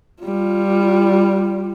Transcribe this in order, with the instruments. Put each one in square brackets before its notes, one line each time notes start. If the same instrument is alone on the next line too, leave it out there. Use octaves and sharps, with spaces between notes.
[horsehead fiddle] G3 F4